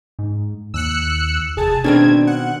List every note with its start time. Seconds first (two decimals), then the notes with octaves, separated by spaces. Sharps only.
0.19 G#2
0.74 D#2 E6 F#6 C#7
1.57 F1 G#4 A5
1.84 B2 D#3 C4 D4 G#6
2.27 F#5